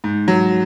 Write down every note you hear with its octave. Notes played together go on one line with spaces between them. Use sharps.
G#2
F#3